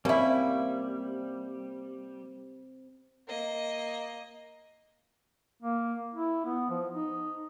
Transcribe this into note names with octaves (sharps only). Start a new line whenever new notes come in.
G3 A#3 C4 C#4 E4
A#3 D#5
A#3
E4
B3
F3
D#4